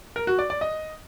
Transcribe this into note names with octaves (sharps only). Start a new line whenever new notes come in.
A#4
F#4
D5
D5
D#5